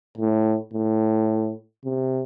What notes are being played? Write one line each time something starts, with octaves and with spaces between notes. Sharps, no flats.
A2
A2
C3